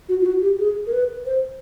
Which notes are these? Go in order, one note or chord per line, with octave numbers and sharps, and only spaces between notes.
F#4
F4
F#4
G4
G#4
A#4
B4
C5